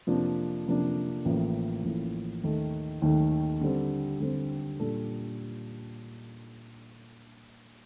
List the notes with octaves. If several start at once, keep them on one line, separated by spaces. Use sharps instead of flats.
F2 C3 F3 A#3 D4
F2 C3 F3 A#3 D4
A1 A2 F3 A#3
A1 A2 F3 A#3
D#2 D#3 A3
D#2 D#3 A3
D3 G3 C4
D3 G3 C4
A#2 G3 D4 A4